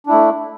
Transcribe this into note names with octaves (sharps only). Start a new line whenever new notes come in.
A3 D4 E4